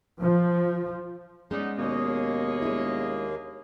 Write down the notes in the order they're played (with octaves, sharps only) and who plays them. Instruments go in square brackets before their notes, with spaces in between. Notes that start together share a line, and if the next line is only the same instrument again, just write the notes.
[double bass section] F3
[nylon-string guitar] G#3 C#4 D5 [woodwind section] B3 D#4
[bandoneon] D#2 A#3 [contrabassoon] B2 [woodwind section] G#4 C#5 D#5
[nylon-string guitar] G#3 D4 E4